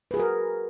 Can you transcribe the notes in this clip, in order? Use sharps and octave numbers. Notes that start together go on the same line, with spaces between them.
F#4 G#4 A#4 B4